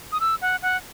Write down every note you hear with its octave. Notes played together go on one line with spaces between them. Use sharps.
D#6
E6
F#5
F#5